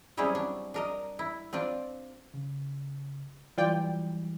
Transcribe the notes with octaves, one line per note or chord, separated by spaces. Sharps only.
F#3 G3 C4 C#4 E4 G#4
D4
D4 A#4 D#5
E4
C4 D4 F4 D5
C#3
E3 F#3 G3 F4 D5 G5